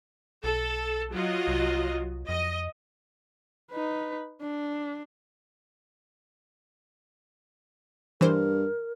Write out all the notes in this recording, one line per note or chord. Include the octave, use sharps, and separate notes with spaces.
B1 A4
F#3 F4 D#5
C2
F2 D#5
D#4 B4
D4
G2 E3 A#4 C5